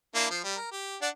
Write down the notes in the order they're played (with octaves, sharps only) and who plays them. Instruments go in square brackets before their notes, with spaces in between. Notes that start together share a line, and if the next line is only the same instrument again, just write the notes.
[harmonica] A#3 D4 E4
F3 C5
G3
A#4
G4
D4 D5 F#5